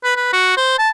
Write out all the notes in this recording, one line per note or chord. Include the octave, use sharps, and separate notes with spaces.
B4
B4
F#4
C5
A5